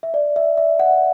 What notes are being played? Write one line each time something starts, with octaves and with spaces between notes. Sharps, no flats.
E5
D5
E5
E5
F#5